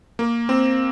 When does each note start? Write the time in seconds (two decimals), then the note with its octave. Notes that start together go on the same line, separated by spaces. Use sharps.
0.19 A#3
0.49 C4